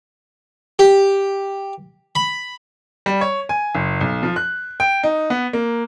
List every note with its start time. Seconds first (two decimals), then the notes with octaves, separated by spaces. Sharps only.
0.79 G4
2.15 B5
3.06 G3
3.21 C#5
3.49 G#5
3.75 F#1
4.01 B1
4.23 F3
4.36 F#6
4.80 G5
5.03 D#4
5.30 B3
5.53 A#3